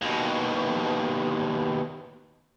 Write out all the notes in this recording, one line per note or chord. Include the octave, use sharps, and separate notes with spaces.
D#2 B2